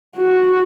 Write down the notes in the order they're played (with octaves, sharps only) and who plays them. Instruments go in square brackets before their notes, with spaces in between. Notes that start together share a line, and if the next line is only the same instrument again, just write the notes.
[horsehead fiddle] F#4